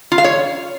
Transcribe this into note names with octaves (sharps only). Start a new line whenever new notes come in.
F4
F5
C#5